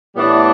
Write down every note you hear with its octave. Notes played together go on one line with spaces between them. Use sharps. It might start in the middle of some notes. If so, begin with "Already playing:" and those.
A2 E3 G3 B3 D4